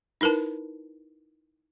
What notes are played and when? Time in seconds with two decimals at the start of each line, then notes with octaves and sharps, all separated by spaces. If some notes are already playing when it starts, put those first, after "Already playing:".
0.21 D#4 E4 A#4 B4 A5